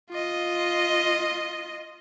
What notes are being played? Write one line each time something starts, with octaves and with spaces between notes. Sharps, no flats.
F4 D#5